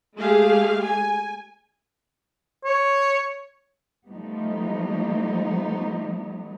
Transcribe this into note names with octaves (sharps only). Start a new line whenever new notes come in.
G#3 A3 G4 G#4 F5
G#5
C#5
F3 G3 A3 B3 D#4